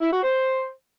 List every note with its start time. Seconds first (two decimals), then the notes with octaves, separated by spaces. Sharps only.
0.01 E4
0.11 F#4
0.22 C5